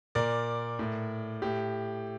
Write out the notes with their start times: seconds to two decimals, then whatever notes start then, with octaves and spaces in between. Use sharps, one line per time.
0.15 A#2 A#4 D5
0.79 A2
1.42 A2 G4